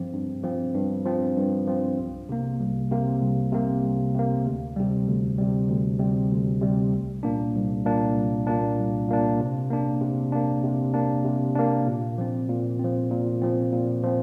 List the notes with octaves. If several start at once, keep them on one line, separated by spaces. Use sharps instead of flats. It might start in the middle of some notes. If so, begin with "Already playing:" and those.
Already playing: G2 F3 C4
G2
F3 C4
G2
F3 C4
G2
F3 C4
C2
C3 A#3
C2
C3 A#3
C2
C3 A#3
C2
C3 A#3
D2
C3 G3
D2
C3 G3
D2
C3 G3
D2
C3 G3
C2
A#2 A#3 D4
C2
A#2 A#3 D4
C2
A#2 A#3 D4
C2
A#2 A#3 D4
C3
A#3 D4
C3
A#3 D4
C3
A#3 D4
C3
A#3 D4
A#2
F3 C4
A#2
F3 C4
A#2
F3 C4
A#2
F3 C4